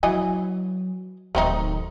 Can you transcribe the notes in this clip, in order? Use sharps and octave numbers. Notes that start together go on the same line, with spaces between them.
E3 F#3 D#5 G#5
D1 D#3 A3 C4 D#4